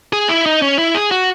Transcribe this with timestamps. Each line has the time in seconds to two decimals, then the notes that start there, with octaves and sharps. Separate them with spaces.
0.13 G#4
0.29 E4
0.46 D#4
0.62 C#4
0.78 E4
0.95 G#4
1.11 F#4